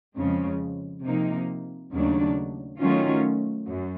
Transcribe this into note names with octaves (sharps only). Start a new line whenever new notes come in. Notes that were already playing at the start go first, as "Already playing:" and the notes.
F2 C#3 F3 G#3
C3 F3 A#3 D#4
D#2 C#3 F#3 A3 D4
D#3 F#3 A3 C#4 F4
F#2